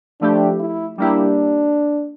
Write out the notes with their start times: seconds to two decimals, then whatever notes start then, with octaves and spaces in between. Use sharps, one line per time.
0.21 F3 A3 D4 E4 G4
0.60 E4
0.98 G3 A#3 D4 E4 G4